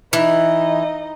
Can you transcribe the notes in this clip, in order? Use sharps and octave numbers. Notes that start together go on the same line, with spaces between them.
E3 D#4 D#5